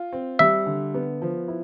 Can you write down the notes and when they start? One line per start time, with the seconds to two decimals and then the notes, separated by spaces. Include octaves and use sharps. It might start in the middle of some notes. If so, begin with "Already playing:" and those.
Already playing: F4
0.13 C4
0.39 G3 E5
0.66 D3
0.94 B3
1.22 F3
1.48 E4